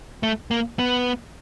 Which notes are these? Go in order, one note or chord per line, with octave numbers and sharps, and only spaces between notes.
A3
A#3
B3